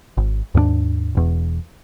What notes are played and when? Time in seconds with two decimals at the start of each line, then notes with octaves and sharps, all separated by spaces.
0.17 G#1
0.55 D#2 G#2 A#3 D4
1.15 E1 E2